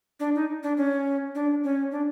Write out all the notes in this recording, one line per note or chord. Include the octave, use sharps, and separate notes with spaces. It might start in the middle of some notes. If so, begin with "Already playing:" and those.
D4
D#4
D4
C#4
D4
C#4
D4